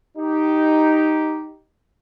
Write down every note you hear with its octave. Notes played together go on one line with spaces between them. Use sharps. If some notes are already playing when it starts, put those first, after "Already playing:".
D#4 G4